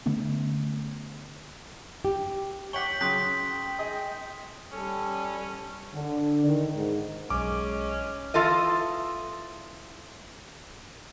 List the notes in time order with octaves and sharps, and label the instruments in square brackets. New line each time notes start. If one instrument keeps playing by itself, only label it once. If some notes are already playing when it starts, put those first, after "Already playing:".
[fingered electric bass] D3 A3 B3 C#4
[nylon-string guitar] G4
[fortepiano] C#5 F#5 D6 [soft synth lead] G5 [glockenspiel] B6 F#7 G7
[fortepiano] C#3 F#3 F#6 [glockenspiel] C6 D#6 B6
[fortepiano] G#4 D#5
[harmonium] G3 A4 [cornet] C#4
[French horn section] D3
D#3
G#2
[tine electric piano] B1 [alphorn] G#3 [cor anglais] C#4 [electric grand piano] D6
[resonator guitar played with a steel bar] E3 F4 A4 D#5